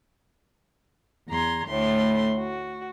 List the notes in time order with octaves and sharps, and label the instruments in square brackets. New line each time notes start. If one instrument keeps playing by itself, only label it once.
[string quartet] E2 A#5 C6 G#6
D2 A2 A3 C6
F#4